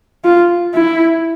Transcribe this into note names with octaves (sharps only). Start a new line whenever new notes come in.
F4
E4